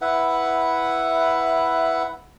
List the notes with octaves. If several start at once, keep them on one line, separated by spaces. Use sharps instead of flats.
E4 B4 E5 F#5